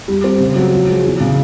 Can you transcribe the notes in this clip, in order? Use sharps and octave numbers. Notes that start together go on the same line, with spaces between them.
G3
C4
C#3
F#3
F3
G#3
E2
C#3